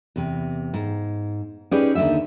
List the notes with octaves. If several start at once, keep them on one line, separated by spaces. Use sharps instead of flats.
E2 C3
G#2
C#4 D#4 G4 G#4 B4 D5
D#2 D3 D4 D#4 E5